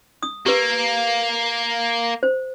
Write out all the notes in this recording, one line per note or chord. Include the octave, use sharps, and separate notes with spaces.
D#6
A#3 G4 B4
C5